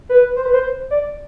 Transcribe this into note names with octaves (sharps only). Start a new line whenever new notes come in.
B4
C5
B4
C5
D5